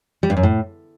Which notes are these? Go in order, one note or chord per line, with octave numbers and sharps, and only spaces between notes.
G3
G2
F#2
A2